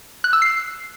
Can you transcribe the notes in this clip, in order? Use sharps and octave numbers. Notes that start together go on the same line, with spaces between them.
F#6
E6
C7